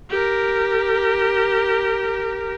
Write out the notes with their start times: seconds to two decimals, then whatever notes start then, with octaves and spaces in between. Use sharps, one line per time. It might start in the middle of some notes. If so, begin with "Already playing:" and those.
0.10 G4 A#4